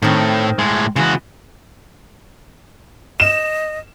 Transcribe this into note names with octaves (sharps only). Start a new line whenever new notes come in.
A2 D#3 C4
A2 G#3
C#3 E3 G#3 F#4
D#5 E7